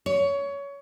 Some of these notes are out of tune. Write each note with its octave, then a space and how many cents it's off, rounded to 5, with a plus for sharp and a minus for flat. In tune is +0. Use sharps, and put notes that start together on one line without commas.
C#5 +20